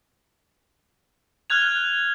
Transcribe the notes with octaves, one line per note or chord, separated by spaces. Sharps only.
F6 F#6 G#6 F7